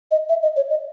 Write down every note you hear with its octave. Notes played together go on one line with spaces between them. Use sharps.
D#5
E5
D#5
C#5
D#5